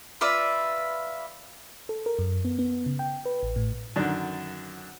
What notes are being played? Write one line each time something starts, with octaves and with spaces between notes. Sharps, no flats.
F4 B4 D5 E5
A4
A#4
F#2
B3
B3
C#3
G5
B4
A1
A2
F#2 D3 D#3 D4